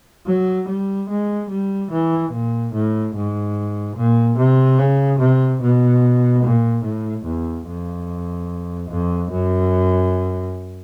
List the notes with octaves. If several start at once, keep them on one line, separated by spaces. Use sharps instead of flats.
F#3
G3
G#3
G3
E3
A#2
A2
G#2
A#2
C3
C#3
C3
B2
A#2
A2
E2
F2
F2
F#2